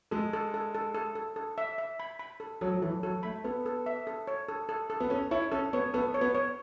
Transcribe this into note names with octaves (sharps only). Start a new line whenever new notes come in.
G#3 A4
A4
A4
A4
A4
A4
A4
E5
E5
B5
B5
A4
F#3 A4
F#3
E3 A4
F#3 A4
A3 B5
B3 A4
A4
E5
A4
C#5
A4
A4
A4
B3
C#4 A4
E4 C#5
C#4 A4
B3 C#5
B3 A4
C#5
B3
C#5